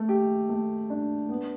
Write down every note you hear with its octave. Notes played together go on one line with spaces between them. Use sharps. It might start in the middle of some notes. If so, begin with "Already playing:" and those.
Already playing: A3
G4
A3
D4
B3